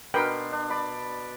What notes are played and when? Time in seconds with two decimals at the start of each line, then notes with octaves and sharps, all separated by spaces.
0.14 B2 D4 A#4 B4 G5 C6
0.52 D4
0.70 D5 B5